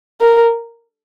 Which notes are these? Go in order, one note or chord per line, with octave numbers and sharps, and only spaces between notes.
A#4